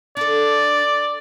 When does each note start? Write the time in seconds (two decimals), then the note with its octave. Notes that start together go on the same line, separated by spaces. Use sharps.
0.17 D4 A4 D5